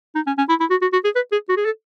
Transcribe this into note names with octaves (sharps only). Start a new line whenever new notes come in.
D#4
C#4
C#4
E4
E4
F#4
F#4
F#4
G#4
B4
G#4
F#4
G#4
A4